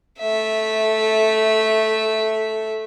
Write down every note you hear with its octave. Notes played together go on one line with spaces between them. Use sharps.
A3 E5